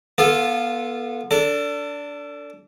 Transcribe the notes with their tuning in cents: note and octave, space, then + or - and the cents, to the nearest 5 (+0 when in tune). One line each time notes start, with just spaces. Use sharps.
B3 -30 F4 -5 A4 -5
D4 -20 A4 +30